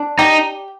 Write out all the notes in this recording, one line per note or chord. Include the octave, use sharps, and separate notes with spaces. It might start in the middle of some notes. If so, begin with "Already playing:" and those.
Already playing: D4
D#4 G4